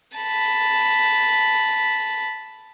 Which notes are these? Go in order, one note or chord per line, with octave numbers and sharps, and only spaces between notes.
A5 B5